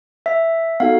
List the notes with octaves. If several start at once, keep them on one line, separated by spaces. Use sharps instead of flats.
E5
B3 D#4 F#4 A4 F5